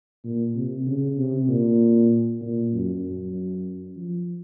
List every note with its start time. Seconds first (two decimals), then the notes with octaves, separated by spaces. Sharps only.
0.24 A#2
0.55 C3
0.86 C#3
1.18 C3
1.48 A#2
2.41 A#2
2.72 F#2
3.04 F#2
3.96 F3